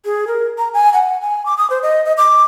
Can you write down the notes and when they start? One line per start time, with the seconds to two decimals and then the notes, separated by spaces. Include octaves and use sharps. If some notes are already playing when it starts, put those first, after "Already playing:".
0.05 G#4
0.27 A#4
0.58 A#5
0.74 G#5
0.94 F#5
1.22 G#5
1.46 D6
1.58 D#6
1.70 C5
1.83 D#5
2.05 D#5
2.17 D6